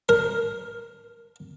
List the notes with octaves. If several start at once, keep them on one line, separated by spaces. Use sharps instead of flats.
A#4